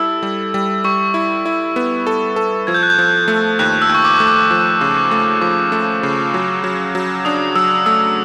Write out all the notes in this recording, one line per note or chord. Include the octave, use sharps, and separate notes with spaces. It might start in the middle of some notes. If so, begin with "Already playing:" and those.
Already playing: G3 E4 A4 E6
G3
G3
G3 C#6
E4
E4
B3
A4
A4
F3 G#6
G6
F#6
G6
F3
A3
D#2 F#6
E6
D#2
C#6
D6
A3
D6
F3
C#3
C#6
A3
F3 D6
A3
C#3
F#3
F#3
F#3
D4 D#6
F#3 E6
A3 E6